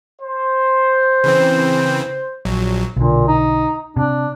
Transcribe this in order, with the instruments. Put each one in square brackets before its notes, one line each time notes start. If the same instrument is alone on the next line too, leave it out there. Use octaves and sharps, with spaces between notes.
[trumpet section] C5
[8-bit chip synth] C#3 E3 C4
A#1 F#3
[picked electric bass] B1 D3 [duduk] A#2
[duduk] D#4
[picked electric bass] C3 [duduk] D4